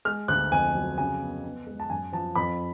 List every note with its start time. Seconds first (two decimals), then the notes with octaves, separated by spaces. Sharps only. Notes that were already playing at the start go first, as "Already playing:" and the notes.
0.05 G#3 F6
0.28 D2 F#6
0.52 F2 G#5
0.75 F#3
0.98 C#3 G#5
1.21 B3
1.44 B3
1.67 G#3
1.80 A5
1.90 F#2 G#5
2.13 F3 A5
2.35 F2 B5